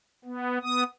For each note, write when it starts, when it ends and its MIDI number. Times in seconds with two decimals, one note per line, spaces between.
0.25 0.58 59
0.63 0.83 59
0.63 0.83 87